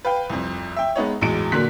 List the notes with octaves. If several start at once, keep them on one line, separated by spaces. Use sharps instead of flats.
B4 F5 G5
C2 F2
E5 G5
G#3 B3 D#4 C#5
A1 E2 F#3 G#3 D7
A#2 D3 F#3 A#3 F#6 B6